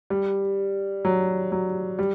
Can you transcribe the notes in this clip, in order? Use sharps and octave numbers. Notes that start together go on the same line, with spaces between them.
G3
F#3
F#3
G3